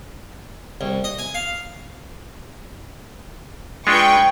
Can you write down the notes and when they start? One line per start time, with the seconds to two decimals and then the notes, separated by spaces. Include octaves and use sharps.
0.81 C2
1.04 D#5
1.19 G#5
1.34 F5
3.87 G#3 D4 F4 B4 G5 C#6